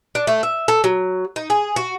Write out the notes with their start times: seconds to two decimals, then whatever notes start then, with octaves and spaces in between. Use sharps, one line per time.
0.15 D4
0.27 A3
0.43 E5
0.68 A4
0.84 F#3
1.36 D#4
1.50 G#4
1.76 F#4